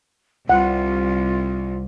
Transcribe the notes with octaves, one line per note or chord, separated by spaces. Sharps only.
C2 F4 F#5